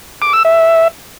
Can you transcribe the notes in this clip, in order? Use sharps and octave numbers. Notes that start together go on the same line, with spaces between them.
D6
E6
E5